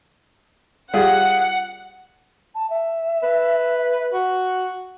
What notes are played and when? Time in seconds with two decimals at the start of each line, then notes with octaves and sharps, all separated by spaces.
0.94 G3 F4 G#4 F#5
2.55 A5
2.70 E5
3.23 B4
4.13 F#4